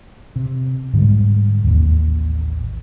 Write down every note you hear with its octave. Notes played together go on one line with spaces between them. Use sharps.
C3
G#2 D3 G3 G#3
A1 D#2